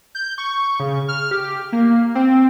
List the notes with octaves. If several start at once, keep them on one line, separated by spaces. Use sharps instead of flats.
G6
C#6
C#3
F6
G4
A#3
C4